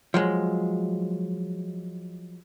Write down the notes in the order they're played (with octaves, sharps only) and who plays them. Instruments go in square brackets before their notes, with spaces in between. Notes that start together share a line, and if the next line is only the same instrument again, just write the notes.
[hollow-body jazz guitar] F3 F#3 G#3